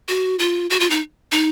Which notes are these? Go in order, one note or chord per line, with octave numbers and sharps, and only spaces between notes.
F#4
F4
F#4
F4
D#4
D#4